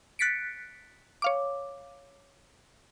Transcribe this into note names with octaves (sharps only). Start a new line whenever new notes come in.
F#6 A6 B6 C#7 D7
C#5 F5 D6